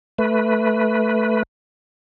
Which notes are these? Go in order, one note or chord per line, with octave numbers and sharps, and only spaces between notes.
A3 B4